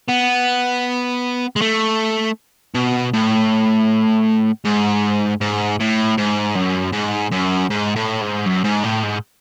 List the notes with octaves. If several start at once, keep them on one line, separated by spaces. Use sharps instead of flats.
B3
G#3
A3
B2
A2
G#2
G#2
A2
G#2
F#2
G#2
F#2
G#2
A2
G#2
F#2
G#2
A2
G#2